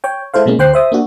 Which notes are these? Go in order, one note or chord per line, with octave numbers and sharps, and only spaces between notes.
C#5 G5
G#3 E4 A4 C5 F5
B2 F#3 G#3 A#3 C#4
D2 C5 G5 F#6 C7
C5 E5 D#6
A#3 D4 F#4